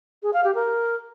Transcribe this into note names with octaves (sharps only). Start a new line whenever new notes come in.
G#4
F5
G4
A#4